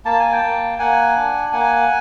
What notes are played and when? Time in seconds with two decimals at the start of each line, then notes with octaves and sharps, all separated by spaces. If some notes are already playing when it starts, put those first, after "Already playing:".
0.05 A#3 A5
0.19 G#5
0.32 G5 A5
0.42 A#3
0.78 A#3 F#5 G#5
1.16 D4
1.52 A#3 F#5 G#5